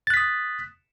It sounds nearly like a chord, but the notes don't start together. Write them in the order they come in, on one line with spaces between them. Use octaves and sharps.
A6 F#6 B6 D#6